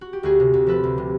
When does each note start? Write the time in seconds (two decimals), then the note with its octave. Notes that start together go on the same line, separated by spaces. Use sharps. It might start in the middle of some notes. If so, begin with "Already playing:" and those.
0.01 F#4
0.13 G4
0.23 D2 F#4 G#4
0.40 C3
0.54 D2
0.67 F3 A4 B4
0.84 D2
0.98 C3